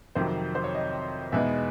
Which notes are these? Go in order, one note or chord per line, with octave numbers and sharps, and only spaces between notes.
F2 C3 D#3 F#3 C5
C5
C#5
D#5
E2 B2 G#3 B3 D#4 E5